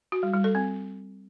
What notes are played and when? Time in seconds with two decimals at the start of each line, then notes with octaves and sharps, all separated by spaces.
0.12 F#4
0.23 G3
0.33 G3
0.44 A4
0.55 C4